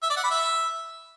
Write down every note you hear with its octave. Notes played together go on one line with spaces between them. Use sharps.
E5
D5
F#5
B5
E5